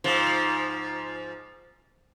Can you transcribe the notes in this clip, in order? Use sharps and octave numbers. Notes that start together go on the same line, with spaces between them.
G#2 F3